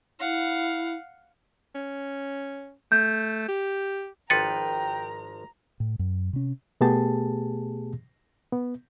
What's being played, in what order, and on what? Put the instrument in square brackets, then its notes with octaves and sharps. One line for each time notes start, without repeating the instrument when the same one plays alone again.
[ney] E4 [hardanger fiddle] F5 F#5
[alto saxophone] C#4
[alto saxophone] A3 [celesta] G6
[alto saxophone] G4
[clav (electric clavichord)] G#1 F3 B4 [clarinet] G5 [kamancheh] A#5 [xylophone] A6 C#7
[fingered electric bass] A2
F#2
C3 C#4
[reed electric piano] B2 A3 B3 G4 G#4 A5
B3